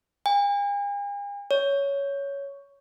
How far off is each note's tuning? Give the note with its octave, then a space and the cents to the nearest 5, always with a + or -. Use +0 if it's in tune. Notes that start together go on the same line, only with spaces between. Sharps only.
G#5 -45
C#5 +10